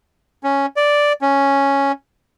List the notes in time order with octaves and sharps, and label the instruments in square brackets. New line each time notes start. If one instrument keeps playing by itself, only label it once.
[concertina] C#4
D5
C#4